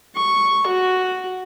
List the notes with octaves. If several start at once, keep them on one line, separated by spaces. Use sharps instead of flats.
C#6
F#4